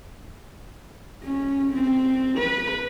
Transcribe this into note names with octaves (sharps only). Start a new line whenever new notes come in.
C#4
C4
B4